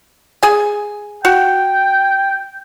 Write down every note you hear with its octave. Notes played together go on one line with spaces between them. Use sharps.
G#4 G#5
F#4 G5